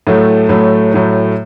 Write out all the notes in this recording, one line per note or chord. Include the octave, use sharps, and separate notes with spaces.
A2 F#3 A3
A2 F#3 A3
A2 F#3 A3